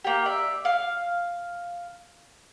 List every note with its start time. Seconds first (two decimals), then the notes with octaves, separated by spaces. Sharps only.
0.04 A#3 G4
0.26 D5 E5
0.65 F5